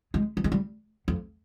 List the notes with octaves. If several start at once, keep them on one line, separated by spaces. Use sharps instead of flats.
G#3
G3
G#3
G3
F2